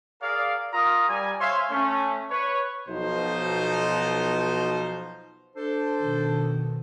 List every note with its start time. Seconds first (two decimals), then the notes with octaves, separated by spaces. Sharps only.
0.21 G#4 A#4 D5 F5
0.73 F4 A#4 A#5 D#6
1.09 G3 G#5
1.40 C5 C#5 E5 F5 G#5 C6
1.71 A3 C#4
2.30 B4 C#5
2.87 B1 B2 F3 D#4 C5
5.56 D4 A4 C5
6.01 B2 D#3